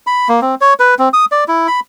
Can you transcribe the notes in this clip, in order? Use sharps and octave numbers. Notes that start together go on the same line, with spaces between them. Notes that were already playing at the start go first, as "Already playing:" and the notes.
B5
A#3
C4
C#5
B4
C4
D#6
D5
E4
B5